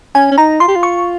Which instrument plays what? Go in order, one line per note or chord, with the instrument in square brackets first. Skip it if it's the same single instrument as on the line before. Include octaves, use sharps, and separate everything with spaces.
[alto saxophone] C#4 [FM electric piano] G#5
[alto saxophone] C#4
[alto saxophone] D#4 [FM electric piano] A#5
[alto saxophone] F4 [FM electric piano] C6
[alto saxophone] G4
F4
[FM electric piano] C#6